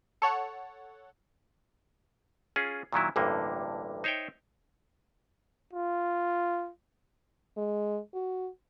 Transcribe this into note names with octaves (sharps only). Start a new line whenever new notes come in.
A4 C#5 F#5
C#4 F4 G#4
A#2 D#3 F#3 E4
A1 D2 G2 D3 A#3
D#4 C5 C#5 E5 G5
F4
G#3
F#4